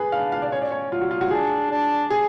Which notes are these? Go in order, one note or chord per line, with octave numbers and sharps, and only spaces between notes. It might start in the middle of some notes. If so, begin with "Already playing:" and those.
Already playing: G#4 B4
D4 F5
F5
D5
C#4 C#5
D5
C#5
F#3 F4
F#4
F4
F#4
D4 G#4
D4
G#4